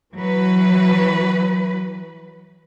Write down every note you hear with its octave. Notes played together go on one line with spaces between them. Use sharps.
E3 F#3 B4